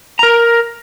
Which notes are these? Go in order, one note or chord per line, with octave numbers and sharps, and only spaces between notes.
A#4 A#5